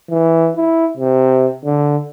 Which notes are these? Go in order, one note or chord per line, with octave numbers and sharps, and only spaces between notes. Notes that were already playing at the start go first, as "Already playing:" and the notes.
E3
E4
C3
D3